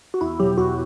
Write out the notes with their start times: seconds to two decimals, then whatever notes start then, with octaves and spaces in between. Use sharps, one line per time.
0.14 F#4
0.21 E2 E4
0.40 B2 F#3 G4
0.58 E2 F#4